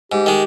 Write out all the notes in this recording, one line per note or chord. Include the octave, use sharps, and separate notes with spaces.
G#2 G4
D#3 G#3